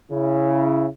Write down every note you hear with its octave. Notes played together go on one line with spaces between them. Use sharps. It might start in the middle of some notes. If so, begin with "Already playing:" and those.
C#3 E4